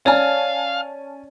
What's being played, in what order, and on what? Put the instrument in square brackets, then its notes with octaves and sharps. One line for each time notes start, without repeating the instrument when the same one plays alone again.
[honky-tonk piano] C#4 G#5 A5 [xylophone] C#5 D5 F6 [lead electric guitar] F5